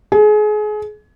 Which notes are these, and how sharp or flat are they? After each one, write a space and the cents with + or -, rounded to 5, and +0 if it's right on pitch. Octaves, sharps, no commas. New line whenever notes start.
G#4 +30